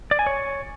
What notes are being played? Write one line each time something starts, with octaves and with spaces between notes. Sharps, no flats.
D5
G#5
C#5